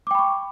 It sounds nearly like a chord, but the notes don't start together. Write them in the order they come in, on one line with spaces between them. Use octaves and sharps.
D6 G5 B5 C#6